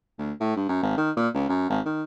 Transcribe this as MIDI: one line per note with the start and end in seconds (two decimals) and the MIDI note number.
0.18 0.32 38
0.41 0.55 45
0.57 0.65 43
0.69 0.80 42
0.83 0.94 32
0.98 1.11 51
1.17 1.28 46
1.34 1.47 37
1.49 1.68 42
1.70 1.80 32
1.85 2.03 51